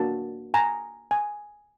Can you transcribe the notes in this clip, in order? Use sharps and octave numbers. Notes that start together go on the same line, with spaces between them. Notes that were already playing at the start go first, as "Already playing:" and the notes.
Already playing: A#3 D4 F#4 A5
G#5 A#5
G#5